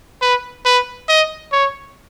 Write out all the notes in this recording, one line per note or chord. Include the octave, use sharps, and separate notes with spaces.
B4
B4
D#5
C#5